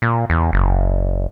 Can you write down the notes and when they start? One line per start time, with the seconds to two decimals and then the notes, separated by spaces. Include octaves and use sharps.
0.02 A#2
0.30 E2
0.53 F#1